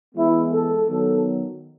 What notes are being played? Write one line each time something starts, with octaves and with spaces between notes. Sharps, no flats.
E3 G#3 B3 E4
A4
D#3 F#3 B3 A4